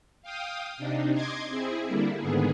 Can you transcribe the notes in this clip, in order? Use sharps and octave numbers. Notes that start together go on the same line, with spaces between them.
F5 G5 D#6
C3 D4 D#4
D#5 C6 D6 G#6
C4 E4 G#4
D3 G3 A#3 E4
G#2 D3 D#3 B3 G#4